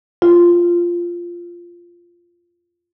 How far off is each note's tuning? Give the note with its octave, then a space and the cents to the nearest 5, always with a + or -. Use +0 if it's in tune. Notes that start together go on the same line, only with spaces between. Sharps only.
F4 -5